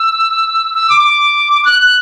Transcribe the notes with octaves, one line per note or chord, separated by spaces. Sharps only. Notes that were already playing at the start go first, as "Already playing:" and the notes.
Already playing: E6
E6
D6
D6
F#6
F#6